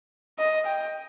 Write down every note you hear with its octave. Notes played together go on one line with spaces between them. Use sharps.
D#5
G5